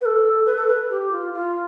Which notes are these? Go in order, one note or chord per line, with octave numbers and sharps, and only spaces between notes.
B4
A4
B4
A4
B4
G4
F4
F4